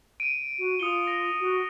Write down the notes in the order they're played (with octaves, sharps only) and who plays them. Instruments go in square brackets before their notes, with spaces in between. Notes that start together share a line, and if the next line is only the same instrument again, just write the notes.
[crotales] D7 D#7
[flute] F#4
[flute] F4 [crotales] D#6 C#7 G7
[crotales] A#6
[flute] F#4